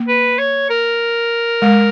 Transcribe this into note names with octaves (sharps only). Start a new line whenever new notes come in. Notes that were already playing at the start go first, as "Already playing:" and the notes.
Already playing: A#3
B4
C#5
A#4
G#3